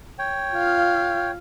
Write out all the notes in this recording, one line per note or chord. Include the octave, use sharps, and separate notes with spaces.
C#5 G5
F4 F5